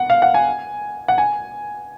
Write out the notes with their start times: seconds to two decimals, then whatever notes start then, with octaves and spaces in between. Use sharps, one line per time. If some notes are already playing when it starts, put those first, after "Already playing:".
Already playing: F#5
0.10 F5
0.22 F#5
0.34 G#5
1.08 F#5
1.18 G#5